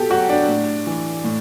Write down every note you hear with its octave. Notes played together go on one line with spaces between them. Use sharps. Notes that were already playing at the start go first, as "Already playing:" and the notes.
Already playing: B2 G4 A4
F#3 F#4
D4
A2
E3
A2